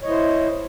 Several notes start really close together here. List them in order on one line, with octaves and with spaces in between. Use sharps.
C#5 D#5 E4 C5